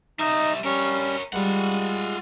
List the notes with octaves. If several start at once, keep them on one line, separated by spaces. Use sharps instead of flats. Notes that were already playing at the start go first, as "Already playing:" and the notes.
G3 D#4 D#5 E5
G3 C#4 A#4 C#5
G3 G#3 F4 F#5